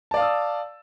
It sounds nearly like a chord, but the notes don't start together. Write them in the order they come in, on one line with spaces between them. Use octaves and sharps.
A5 D5 F5 D#6 E6